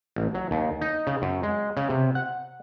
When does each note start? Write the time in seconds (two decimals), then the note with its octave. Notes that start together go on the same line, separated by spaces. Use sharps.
0.16 A1
0.34 F#3
0.51 D#2
0.81 D#4
1.07 C#3
1.22 F#2
1.43 G#3
1.77 C#3
1.89 C3
2.15 F#5